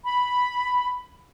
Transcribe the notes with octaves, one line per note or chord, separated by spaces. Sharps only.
B5